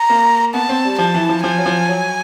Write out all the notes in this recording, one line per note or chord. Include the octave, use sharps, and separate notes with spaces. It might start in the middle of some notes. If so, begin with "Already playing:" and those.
Already playing: A#5
A#3
B3 A5
C4
G3
F3 A5
E3
F3
F3 G#5
F#3
F3
F#3